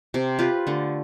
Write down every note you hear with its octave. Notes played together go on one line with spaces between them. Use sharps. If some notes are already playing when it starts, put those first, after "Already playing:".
C3
F4 G4 B4
D3 A3